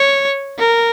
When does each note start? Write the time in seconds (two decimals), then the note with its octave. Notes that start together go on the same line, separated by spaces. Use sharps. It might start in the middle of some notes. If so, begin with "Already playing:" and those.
Already playing: C#5
0.59 A#4